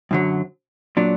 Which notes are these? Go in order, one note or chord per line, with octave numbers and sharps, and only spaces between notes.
F#2 D3 F#3
A#2 F#3 D4